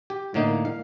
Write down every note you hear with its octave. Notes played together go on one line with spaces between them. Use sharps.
G4
A2 D3 A#3 D#4
F5